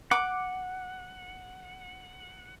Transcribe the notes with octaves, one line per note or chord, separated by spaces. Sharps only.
F#5 D6